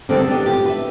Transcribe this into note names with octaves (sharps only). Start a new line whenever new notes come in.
D3 D#3 G3 C4 D4 A4
B3 D4 G4
F4 G4
B4 E5